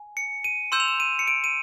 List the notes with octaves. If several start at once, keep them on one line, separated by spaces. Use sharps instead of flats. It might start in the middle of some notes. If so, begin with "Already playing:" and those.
Already playing: G#5
C#7
D#7
C6 E6 G6 E7
F7
E7
D#7
C#7
D7
D#7